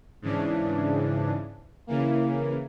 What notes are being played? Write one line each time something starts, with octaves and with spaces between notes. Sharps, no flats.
G#2 C#3 E3 D4
C#3 E3 A#3